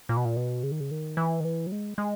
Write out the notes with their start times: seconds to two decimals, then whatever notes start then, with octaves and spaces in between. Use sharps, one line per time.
0.09 A#2
0.17 B2
0.25 A#2
0.37 B2
0.63 C#3
0.71 D#3
0.80 C#3
0.91 D#3
1.17 E3
1.40 D#3
1.44 E3
1.67 F#3
1.72 G#3
1.98 G#3